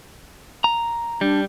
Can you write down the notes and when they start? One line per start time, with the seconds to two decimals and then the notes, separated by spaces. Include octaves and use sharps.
0.64 A#5
1.21 G3 D4